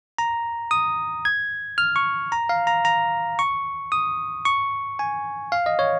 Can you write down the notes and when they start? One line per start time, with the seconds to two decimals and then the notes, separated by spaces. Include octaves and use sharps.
0.18 A#5
0.71 D#6
1.25 G#6
1.78 F6
1.96 C#6
2.32 A#5
2.49 F5
2.67 A#5
2.85 A#5
3.39 C#6
3.92 D#6
4.45 C#6
4.99 G#5
5.52 F5
5.66 D#5
5.79 C#5